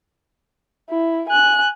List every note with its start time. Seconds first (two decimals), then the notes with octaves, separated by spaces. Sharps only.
0.90 E4
1.29 G#5 F#6